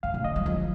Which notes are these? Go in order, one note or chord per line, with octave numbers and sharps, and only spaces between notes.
F#2 F5
A#2
D#3 D#5
F#3
F3